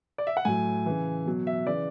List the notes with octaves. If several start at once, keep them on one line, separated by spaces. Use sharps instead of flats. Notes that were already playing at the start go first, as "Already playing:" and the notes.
D5
E5
F#5
A2 F#3 G#5
C#3 E3
B2 F#3
E5
C#3 E3 D5